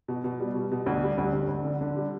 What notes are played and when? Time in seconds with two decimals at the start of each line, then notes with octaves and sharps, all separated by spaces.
0.08 B2
0.24 B2
0.40 G3
0.55 B2
0.72 B2
0.86 D2
1.03 G3
1.18 D2
1.33 D2
1.49 D2
1.65 D3
1.81 D3
1.96 G3